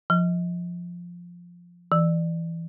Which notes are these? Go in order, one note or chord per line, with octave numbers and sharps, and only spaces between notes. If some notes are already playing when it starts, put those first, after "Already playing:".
F3
E3